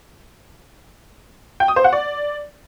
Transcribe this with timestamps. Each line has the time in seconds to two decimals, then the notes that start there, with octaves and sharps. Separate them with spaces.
1.60 G5
1.68 D#6
1.76 C5
1.84 F#5
1.93 D5